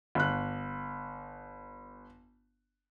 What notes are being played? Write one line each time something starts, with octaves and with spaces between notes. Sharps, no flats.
G1 F#6